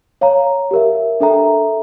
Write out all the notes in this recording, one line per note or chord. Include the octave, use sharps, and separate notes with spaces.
C#5 F5 A#5
G4 A#4 E5
D4 A4 E5 G5 A#5